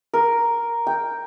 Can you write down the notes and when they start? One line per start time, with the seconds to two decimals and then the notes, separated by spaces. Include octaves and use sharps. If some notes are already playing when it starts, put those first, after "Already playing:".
0.13 A#4
0.87 G5